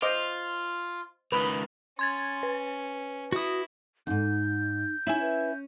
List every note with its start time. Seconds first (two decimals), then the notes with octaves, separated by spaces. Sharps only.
0.02 F4 C5 D#5 D6
1.32 C#2 D#3 B4
1.99 C#4 C6 G#6 A6
2.43 B4
3.32 E4 F#4 D#6
4.07 E2 G#2 D#4 G6
5.07 C#4 D#4 E4 E5 G#5
5.21 B4